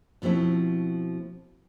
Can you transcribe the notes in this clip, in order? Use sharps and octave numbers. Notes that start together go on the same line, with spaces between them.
B2 F3 A3 C4 E4